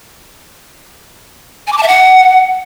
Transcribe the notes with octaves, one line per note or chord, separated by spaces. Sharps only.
G#5
D6
A5
E5
F#5